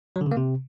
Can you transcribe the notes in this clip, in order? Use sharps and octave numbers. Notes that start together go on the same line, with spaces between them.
F#3
D3
C#3
A#3
C3